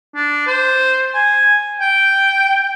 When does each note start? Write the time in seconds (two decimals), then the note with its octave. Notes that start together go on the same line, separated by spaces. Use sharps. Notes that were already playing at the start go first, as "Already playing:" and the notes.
0.15 D4
0.47 C5
1.14 G#5
1.80 G5